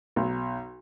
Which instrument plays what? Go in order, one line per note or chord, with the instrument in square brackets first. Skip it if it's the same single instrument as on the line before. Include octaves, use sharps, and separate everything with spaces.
[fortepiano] B1